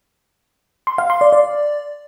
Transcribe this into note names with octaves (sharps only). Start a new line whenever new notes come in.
C6
F5
C6
D5
D5